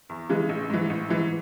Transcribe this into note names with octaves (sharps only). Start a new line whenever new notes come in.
E2
C#3 E3 G#3
A1
G#2 E3
A1
G#2 E3